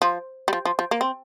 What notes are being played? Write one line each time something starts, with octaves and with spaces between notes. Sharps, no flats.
F3
G3
F3
F3
F3
A#3
C4